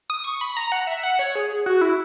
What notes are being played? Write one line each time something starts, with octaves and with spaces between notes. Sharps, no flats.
D#6
C#6
B5
A#5
F#5
E5
F#5
C#5
G#4
F#4
E4